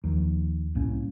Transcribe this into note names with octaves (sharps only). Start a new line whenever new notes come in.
D#2 F3
C2 A2 A#3 C#4